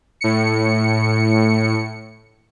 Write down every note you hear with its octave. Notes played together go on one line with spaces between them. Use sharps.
A2 C#7